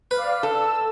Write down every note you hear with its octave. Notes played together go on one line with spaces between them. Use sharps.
B4 D5 F5
A4 E6